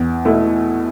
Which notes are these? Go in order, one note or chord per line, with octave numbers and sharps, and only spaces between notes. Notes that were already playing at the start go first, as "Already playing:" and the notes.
Already playing: E2
B2 A3 E4